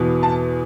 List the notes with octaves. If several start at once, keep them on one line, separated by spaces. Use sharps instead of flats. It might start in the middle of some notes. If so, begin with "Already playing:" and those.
Already playing: E2 B2
A5